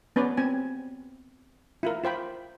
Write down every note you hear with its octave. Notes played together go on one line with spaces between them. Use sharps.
B3 C#4 B4 C#5 D5
C4 G#5
E4 F4 A#4
F4 C5 G5 B5